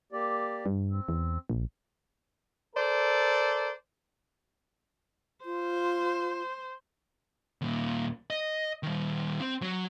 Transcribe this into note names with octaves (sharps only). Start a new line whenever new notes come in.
A#3 G4 D5
G2
C4
E2
A#1
A4 A#4 C5 D5
F4 C5
D#2 A#2
D#5
D#3 G3
C4
F#3